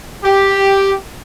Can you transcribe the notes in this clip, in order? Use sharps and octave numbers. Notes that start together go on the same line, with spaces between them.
G4